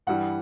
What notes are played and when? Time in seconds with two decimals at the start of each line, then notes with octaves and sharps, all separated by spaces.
0.07 G2 E3 G3 F#5